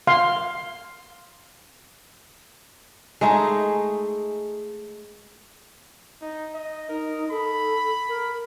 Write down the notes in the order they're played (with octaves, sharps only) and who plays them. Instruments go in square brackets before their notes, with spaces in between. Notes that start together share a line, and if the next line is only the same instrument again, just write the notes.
[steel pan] F5 C6
[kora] G#3 A3 D#4 G#4
[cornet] D#4
D#5
[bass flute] D#4 [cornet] A#4
[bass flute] A4 [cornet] B5
[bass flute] A#4